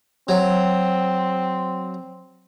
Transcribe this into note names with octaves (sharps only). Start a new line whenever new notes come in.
F#3 C4